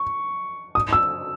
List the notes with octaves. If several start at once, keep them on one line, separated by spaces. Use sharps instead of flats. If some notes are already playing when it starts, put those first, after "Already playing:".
Already playing: C#6
D#6
E6